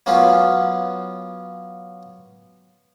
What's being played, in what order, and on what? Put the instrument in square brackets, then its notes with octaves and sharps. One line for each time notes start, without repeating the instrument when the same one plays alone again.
[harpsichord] F#3 A#3 B3 C#4 F4